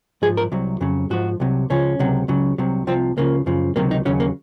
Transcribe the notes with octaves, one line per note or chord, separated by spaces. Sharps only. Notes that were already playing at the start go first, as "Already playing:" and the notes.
G#2 F3 G#4
A#4
C2 C3 F#3
F2 C#3 F#3
G#2 F3 F#4
C2 C3 F#3
C#2 C#3 F3 C#4
C#2 C3 F#3
C#2 C#3 F#3
C2 C3 F#3
C2 C3 F3 C4
C#2 C#3 F3 A#3
F#2 C#3 F3
C#2 C3 D#3 F#3 A#3
D#4
D#2 C#3 F#3 C#4
A#3